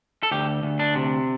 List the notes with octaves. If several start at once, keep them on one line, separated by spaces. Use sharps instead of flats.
A4
D2 G4
D2
D4
C3